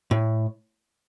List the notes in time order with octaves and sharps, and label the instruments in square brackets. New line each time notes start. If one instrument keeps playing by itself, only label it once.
[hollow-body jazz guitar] A2